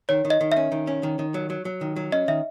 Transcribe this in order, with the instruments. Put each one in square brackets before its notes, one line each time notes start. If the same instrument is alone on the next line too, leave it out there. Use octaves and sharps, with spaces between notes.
[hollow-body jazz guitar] D#3 [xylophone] C#5
[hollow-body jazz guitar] D#3
[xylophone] D#5
[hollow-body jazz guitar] D#3
[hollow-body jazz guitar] C#4 [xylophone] E5
[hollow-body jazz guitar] D#3
C#4
D#3
D#3
F#3
F#3
F#3
D#3
F#3
[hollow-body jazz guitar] C#4 [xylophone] D#5
[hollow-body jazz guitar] D#3 [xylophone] E5